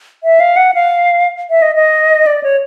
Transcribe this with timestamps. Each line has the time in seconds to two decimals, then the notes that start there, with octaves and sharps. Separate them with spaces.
0.24 E5
0.40 F5
0.56 F#5
0.74 F5
1.50 E5
1.62 D#5
1.75 D#5
2.27 D5
2.43 C#5